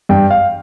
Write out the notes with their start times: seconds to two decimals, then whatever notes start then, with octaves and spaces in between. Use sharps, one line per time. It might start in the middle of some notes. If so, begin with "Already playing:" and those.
0.09 G2 G5
0.30 F5